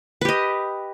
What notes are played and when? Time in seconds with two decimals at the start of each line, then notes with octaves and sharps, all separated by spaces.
0.21 B4
0.25 G4
0.29 D#5